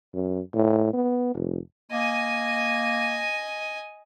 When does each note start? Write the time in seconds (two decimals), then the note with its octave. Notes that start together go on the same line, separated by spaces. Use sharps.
0.14 F#2
0.54 A2
0.94 B3
1.34 F1
1.91 A#3 D#5 G#5